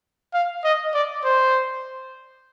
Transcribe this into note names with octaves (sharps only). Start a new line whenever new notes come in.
F5
D#5
D5
C5